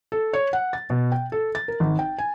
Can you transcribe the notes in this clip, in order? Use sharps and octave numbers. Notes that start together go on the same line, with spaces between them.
A4
C#5
F#5
A6
B2
G5
A4
A6
A#4
G#1
G5
G#5